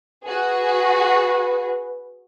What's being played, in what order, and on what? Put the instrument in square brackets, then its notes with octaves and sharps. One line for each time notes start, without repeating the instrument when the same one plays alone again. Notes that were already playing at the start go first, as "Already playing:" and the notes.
[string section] F#4 G#4 [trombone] B4